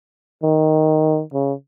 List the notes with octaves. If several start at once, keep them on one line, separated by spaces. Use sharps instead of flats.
D#3
C#3